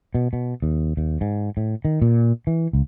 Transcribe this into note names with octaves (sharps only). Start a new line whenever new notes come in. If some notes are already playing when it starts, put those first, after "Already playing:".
B2
B2
D#2
D#2
G#2
A2
D#3
A#2
E3
C#2